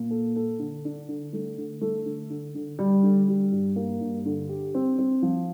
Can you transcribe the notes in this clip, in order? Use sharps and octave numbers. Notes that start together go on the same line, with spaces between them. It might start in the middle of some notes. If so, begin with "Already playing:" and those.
Already playing: A#2
A4
A4
D3
D4
D3
A3
D3
A3
D3
D3
D3
G3
D3
G3
G2
A#3
G2
D3
G4
C4
C4
F3